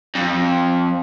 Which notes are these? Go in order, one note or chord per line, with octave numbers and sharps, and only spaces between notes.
F2